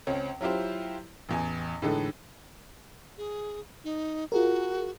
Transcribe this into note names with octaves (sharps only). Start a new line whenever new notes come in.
C#2 C4 C#4
F#3 E4 F4 G4 C5
A1 E2 G#5
A2 D3 E3 G#3 D#4 A4
G#4
D#4
F4 F#4 G#4 A#4